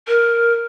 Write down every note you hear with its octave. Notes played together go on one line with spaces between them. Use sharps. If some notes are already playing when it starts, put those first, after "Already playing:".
A#4